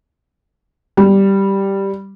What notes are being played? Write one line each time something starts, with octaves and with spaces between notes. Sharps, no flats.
G3